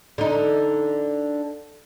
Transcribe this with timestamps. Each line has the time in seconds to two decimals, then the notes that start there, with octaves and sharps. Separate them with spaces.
0.18 D3 D#4